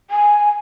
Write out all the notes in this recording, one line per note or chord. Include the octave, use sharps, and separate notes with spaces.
G#5